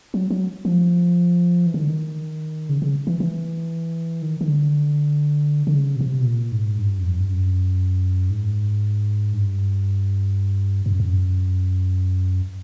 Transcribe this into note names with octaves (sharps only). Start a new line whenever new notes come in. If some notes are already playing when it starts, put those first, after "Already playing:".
F#3
F#3
F3
E3
D#3
D3
D#3
C#3
C#3
E3
E3
D#3
D#3
D3
D3
C#3
B2
C3
B2
A#2
G#2
G2
F#2
F2
G2
F#2
G#2
G2
G2
F#2
F2
F#2